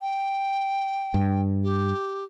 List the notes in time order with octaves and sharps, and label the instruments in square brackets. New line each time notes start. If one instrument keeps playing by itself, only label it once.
[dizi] G5
[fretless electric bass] G2
[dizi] G4